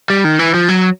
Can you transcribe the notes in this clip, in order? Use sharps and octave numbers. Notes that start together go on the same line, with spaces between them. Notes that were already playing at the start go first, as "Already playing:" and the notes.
G3
D#3
E3
F3
F#3